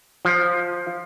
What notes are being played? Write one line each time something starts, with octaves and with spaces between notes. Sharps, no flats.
F3